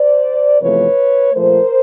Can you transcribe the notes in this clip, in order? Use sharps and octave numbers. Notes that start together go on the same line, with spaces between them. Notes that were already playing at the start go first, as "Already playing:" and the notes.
Already playing: C5 D5
E2 C3 F3 A3 B4 C#5
A#2 F3 A3 A#4 C5